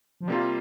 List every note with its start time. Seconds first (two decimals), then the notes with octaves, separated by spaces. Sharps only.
0.21 F3
0.28 C3 G3 A#3 F4